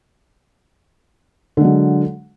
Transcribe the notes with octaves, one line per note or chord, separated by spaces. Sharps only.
D3 F#3 G#3